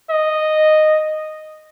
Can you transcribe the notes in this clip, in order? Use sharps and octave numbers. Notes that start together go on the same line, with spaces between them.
D#5